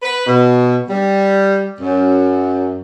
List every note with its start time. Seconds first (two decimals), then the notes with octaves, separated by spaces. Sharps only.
0.03 B4
0.27 B2
0.89 G3
1.81 F#2